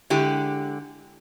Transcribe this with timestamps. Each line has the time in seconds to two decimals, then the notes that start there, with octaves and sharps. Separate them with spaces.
0.10 D3 G#3 E4 G4